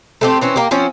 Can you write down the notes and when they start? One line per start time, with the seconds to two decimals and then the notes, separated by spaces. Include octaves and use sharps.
0.21 A3 C4 G4
0.41 E3 C4 C#4
0.56 A#3 G4
0.71 F3 C4 C#4